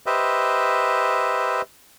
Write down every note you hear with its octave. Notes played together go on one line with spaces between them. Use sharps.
G4 B4 C5 D#5 E5